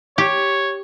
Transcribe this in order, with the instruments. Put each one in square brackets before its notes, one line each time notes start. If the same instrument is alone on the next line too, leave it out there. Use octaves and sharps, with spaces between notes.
[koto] G4 [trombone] C#5